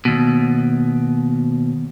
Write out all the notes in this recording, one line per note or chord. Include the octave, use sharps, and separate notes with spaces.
D#2 B2